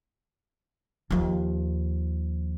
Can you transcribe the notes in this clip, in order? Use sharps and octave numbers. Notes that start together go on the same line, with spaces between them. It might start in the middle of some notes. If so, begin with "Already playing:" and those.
D#2 F3